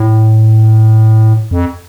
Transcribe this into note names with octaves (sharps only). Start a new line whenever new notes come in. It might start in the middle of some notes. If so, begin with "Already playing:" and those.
Already playing: A2
F2